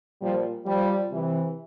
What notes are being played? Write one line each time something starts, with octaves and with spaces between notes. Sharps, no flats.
A#2 F3 G3
F3 G3
C3 E3